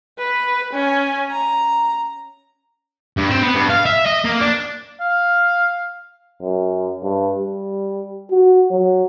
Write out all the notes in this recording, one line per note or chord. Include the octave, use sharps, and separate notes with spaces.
B4
C#4
A#5
G2
C4
B3
G2
F5
E5
D#5
A#3
D4
F5
F#2
G2
G3
F#4
F#3